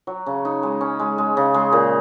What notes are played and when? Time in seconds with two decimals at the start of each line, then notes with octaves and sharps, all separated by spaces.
0.07 F#3
0.26 C#3
0.45 D#4
0.63 G#3
0.81 C#4
0.99 G#3
1.18 G#3
1.37 C#3
1.54 G#3
1.73 A#2